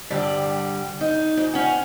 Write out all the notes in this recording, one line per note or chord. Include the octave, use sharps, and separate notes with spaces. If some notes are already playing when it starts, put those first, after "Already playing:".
G2 D3 G3
D#4
G#2
C#4 F#5